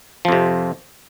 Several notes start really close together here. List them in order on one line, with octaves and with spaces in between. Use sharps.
F3 F2 C3